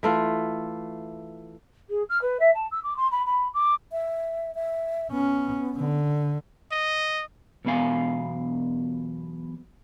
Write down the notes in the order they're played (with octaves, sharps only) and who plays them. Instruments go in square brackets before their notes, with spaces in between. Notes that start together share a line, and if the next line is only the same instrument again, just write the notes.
[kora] E3 A3 F4
[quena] G#4
F6
B4
E5
A5
E6
D6
C6
B5
B5
D6
[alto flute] E5
E5
[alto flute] B3 [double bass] C#4
[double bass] D3
[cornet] D#5
[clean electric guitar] B1 E2 B2 B3 F5 G#5